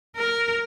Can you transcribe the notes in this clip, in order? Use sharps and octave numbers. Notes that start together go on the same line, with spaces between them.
A#4